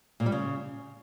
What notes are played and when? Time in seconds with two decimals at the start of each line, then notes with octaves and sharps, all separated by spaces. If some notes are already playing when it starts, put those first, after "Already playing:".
0.20 A#2
0.26 G3
0.32 C#3